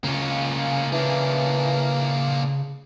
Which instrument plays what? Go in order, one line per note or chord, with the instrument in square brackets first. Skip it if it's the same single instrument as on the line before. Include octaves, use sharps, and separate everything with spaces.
[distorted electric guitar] C#3 F4 [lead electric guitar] A#3 C#4
[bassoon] E3 [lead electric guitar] A#3 D4